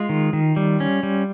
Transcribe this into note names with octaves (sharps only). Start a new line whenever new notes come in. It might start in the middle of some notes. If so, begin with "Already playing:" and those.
Already playing: G#3 F4
D#3
D#3
G3
C#4
G3